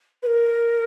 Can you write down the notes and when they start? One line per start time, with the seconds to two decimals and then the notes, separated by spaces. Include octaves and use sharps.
0.23 B4
0.26 A#4